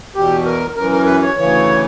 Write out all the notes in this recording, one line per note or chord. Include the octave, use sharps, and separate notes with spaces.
E2 B2 G4
A#4
F#2 E3 A#4
A#4
B4
C#5
D2 C#3 E3 C#5